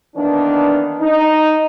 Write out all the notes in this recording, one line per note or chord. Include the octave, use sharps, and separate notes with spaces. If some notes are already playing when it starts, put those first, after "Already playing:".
D#3 E3 A#3 B3 D4
D#4